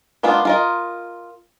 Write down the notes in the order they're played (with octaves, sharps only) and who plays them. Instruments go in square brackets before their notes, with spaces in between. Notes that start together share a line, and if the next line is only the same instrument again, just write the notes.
[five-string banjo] G#3 A#3 B3 D4 F4
F4 A#4 D#5